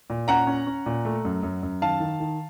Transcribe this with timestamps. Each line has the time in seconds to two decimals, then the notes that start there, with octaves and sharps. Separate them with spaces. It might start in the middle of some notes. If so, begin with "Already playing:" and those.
0.10 A#2
0.28 C#4 F#5 A#5
0.47 C#4
0.67 C#4
0.86 A#2
1.05 A3
1.25 F#2
1.43 F#2
1.63 F#2
1.82 D#3 F5 A5
2.00 D#3
2.20 D#3